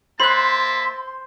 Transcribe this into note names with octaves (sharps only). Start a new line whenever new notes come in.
A#3 C5 E5 A5 B5 C6 F#6